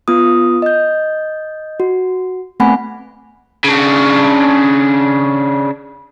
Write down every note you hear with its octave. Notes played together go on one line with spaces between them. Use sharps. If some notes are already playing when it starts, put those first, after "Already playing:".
B3 F4 D#6
D#5 G6
F#4
A3 B3 C4 F#5 G#5 B5
C#3 D4